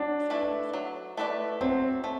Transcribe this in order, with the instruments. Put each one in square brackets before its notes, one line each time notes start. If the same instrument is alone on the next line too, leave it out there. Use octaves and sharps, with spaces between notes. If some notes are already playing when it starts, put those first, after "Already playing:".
Already playing: [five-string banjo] F#3 [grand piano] D4
[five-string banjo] A3 E4 B4 D5
F#3
A3 E4 B4 D5
[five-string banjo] F#3 [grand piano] C4
[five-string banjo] A3